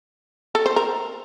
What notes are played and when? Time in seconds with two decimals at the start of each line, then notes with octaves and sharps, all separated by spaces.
0.55 A4
0.66 C5
0.76 A#4